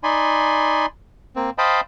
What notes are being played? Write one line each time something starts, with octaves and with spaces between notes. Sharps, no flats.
D#4 D5 G#5 B5 C6
A#3 C4
C5 D#5 F5 G5 A5 B5